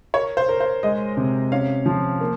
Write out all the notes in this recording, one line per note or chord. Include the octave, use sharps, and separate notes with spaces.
A#4 C#5
C5
A#4
C5
G#3 D#5
C3
C#4 F5
F3
A#3